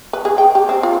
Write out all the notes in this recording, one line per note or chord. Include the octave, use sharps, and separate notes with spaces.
B4
G#4
G5
G4
C4
F4